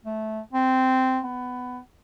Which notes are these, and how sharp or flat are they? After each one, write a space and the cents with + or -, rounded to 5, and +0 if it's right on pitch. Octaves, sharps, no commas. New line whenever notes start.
A3 -15
C4 -10
B3 +15